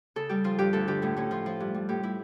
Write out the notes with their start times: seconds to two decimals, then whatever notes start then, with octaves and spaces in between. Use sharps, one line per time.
0.16 C#3 A4
0.29 G3 G4
0.44 F3 F4
0.59 G2 G4
0.73 D2 A4
0.88 D3 G4
1.02 A2 A3
1.17 A2 C#4
1.31 F3 F4
1.46 F3
1.60 G2
1.74 G3
1.89 A2 G4
2.03 A2 E4